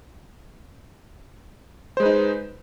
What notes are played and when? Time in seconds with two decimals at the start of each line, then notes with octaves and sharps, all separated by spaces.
1.97 C5
2.00 G#3
2.03 B4
2.06 D#4